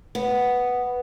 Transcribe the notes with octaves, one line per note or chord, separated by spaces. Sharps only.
B3